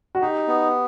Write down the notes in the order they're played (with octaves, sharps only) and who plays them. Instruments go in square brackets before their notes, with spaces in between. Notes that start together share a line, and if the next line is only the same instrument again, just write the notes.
[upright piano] F#4
[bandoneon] D#4 [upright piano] G4
[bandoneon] B3